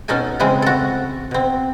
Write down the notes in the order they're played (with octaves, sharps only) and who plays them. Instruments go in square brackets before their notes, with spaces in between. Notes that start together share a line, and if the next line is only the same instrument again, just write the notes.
[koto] B2 C#4 D#4 A4 G#5
C#3 E3 G#3 C4
F#4 A4
B2 C4